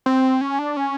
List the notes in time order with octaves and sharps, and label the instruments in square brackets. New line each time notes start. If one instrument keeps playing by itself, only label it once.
[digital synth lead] C4
C#4
D4
C#4